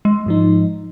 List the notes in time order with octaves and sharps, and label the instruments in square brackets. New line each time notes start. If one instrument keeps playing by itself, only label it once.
[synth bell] G#3
[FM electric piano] G#2 F3 D#4